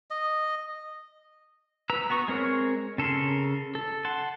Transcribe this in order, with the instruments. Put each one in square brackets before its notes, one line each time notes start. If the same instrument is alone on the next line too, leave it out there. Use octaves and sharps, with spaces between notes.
[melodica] D#5
[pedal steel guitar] B4 A#5 E6
B3 F#4 C#6 D#6
G#3 C4 A#4 C#5
C#3 A4 A#4 C6
A4
F#5 A5 C6